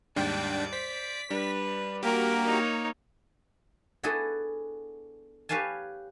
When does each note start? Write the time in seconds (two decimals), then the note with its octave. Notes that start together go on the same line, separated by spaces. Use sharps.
0.16 D#2 G#2 G3 D4 D5 G5
0.73 C5 B6
1.30 G3 D4 B4
2.03 A#3 F#4 G4 A#4
2.47 D#4 C#5
4.03 B3 D4 E4 F#4 G#4 A4
5.49 G4 B4 C#5 F5 G#5 A5